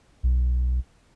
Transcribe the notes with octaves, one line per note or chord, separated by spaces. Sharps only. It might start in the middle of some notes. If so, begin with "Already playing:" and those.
B1